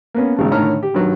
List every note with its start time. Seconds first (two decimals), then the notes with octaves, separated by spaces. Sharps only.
0.14 A#3 B3 C#4
0.37 G#1 C#3 A5
0.51 A2 D3 D#3 C#5 A#5 F6
0.83 G4
0.94 G2 D#3 F#3 G3